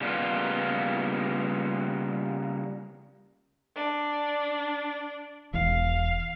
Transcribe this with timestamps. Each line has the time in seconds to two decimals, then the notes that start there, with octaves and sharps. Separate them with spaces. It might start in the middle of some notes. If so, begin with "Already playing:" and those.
0.01 C#3 G3 A#3 B3 F4
3.76 D4
5.53 E1 E2 F5